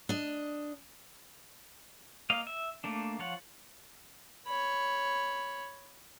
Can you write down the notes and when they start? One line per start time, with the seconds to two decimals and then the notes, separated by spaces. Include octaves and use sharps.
0.09 D4 D#5
2.30 A#3 D#5 F5
2.47 E5
2.84 A3 A#3 D4
3.19 F3 F4 C#5 F#5
4.46 C#5 B5